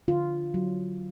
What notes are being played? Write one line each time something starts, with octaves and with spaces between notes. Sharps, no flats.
D3 F4
F#3